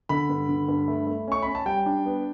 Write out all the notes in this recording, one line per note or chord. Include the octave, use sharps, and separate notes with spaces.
D3 B5
G2
D3
G2
A3
A3
C#4 C#6
C#4 B5
A5
G3 G5
D4
B3